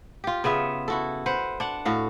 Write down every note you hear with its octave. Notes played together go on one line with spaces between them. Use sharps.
F4 G4
C#3 B3 F4 E5
E4 F#4 A4
B4 C5 F#5
D4 F#5
A2 F#4 F5